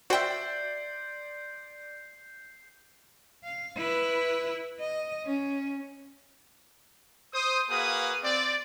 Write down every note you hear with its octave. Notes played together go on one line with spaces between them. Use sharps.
F#4 C5 D5 E5 G5 C6 G6 C7
F5
E4 B4
D#5
C#4
C5 D#6
A#3 F#4 G#4 B4 F5 D#6
C4 D5